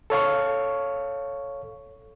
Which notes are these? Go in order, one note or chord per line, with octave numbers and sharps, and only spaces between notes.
A4 C#5 F5 C#6